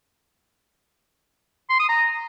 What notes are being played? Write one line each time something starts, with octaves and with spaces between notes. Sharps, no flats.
C6
D#6
A#5